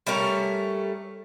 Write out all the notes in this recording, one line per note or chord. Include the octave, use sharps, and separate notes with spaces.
G3 A3 C#4 A#4